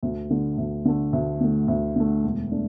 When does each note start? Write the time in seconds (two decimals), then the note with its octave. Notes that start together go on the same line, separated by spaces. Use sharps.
0.03 D2
0.30 D3 A3
0.58 D2
0.85 D3 A3
1.13 D2
1.40 D3 A3
1.68 D2
1.96 D3 A3
2.24 E1
2.52 A3 D4